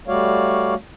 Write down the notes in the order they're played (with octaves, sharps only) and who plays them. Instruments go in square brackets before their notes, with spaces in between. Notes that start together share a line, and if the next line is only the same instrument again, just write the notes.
[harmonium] G3 A3 F#4 C#5 D5 F5